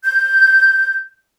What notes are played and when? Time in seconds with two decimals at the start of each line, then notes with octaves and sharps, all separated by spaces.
0.04 G6